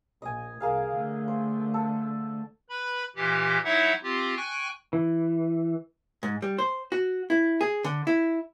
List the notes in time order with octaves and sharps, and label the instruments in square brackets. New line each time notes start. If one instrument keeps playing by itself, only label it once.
[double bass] A#1 [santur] D#5 G#5
[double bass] C2 [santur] A#3 G#4 F5
[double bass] D3 A3
[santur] C5
A4
[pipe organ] B4 B5
A#2 E3 G4
F#3 D#4 E4 E5 F#5
C4 F4 G4
G5 G#5 C#6 F#6
[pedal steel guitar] E3
[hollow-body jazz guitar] G#2
G3
C5
F#4
E4
G#4
D3
E4